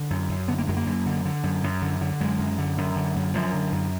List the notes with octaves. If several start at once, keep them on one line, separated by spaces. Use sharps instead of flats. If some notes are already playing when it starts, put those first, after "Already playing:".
Already playing: D3
F#2
F#2
D3 B3
A#3
F#2 G#3
A#3
F#2
D3
D3
F#2
F#2
D3
D3
F#2 G#3
F#2
D3
F#2
D3
F#2
F#2 F3
D3
F#2